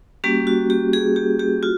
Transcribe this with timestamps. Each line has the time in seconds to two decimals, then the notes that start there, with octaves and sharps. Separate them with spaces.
0.24 G3 A#3 C#4 F#4 G4
0.47 F#4
0.70 G4
0.93 G#4
1.16 G4
1.39 G4
1.63 F4 F#4